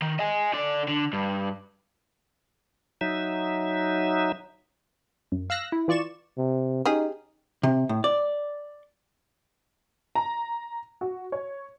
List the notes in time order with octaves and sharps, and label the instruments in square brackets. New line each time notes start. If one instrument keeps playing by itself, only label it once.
[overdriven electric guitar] D#3
D#5 G#5
D3 D5
D3
G2
[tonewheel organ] F#3 D#4 E5
[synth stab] F#2
F5 E6 F#6 A#6
E4
E3 F4 D5 C#6 E7
[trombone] C3
[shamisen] C#4 G4 G#4 [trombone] D#4
[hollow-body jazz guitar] C3
A2
D5
[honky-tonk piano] A#5
F#4
C#5